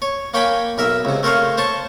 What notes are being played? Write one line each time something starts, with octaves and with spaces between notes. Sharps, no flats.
C#5
A#3 C#5 G5 G#5 B5 D6
B1 A#4 E5
C#2 C3
A3 A#4 C5 C#5 F5
C5 C#5 A5 C#6